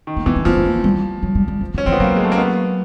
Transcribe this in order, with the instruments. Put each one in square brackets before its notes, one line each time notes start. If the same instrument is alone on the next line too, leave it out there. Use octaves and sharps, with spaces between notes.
[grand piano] D#3
[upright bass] A#3
[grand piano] E3 [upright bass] B3
[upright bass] C4
[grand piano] F3 [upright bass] B3
[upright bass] A3
A#3
G3
F#3
G3
G3
F3
[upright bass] F3 [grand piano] C#4
[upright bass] F3 [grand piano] C4
[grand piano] B3
[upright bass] F#3 [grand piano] A#3
[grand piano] G#3
A3
A#3
B3